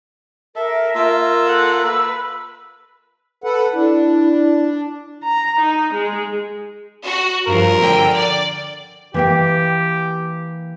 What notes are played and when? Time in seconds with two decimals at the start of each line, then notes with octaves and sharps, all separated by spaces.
0.56 A4 A#4 E5
0.95 A#3 F4 E6
1.46 A4 F#5
1.82 B4 E6
3.44 A4 B4 F#5
3.73 D4 E4
5.24 A#5
5.60 D#4
5.94 G#3
7.03 F#4
7.46 G2 F3 A#4
7.79 D3 G5
8.15 D5
9.14 E3 A#3 G4 G5